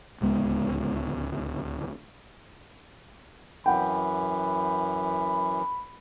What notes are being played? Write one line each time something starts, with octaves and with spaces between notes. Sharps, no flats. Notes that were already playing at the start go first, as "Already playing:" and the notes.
D1 C#2 G#3 B3
F#2 E3 F#5 G5 B5